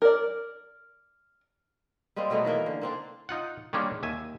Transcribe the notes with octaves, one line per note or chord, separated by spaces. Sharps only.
A#4 D5
G3 G#3 A#3 C4
B2 F#3 A3 B3
D#3 E3 A#3 A#4
D3
A#3 C4 D4
D#4 F4 F#5
D#3 G3 G#3 A#3 C#4 D4
D#2 E5 G#5